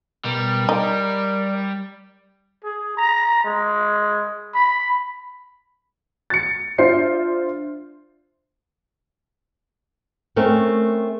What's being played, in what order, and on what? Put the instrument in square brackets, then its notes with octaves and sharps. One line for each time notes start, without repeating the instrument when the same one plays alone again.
[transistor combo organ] B2 [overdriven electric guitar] G3 [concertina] A#4
[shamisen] D#4 [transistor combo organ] D5
[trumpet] G#4
A#5
G#3
B5
[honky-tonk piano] A6 C#7
D4 F4 C5 E5 C7
[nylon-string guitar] A3 C4 C#4 A#4